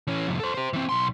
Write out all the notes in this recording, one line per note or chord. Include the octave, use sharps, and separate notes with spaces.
E3 C#4
C2 F2
A4 C5
G4 C5
E3 C4
B1 C6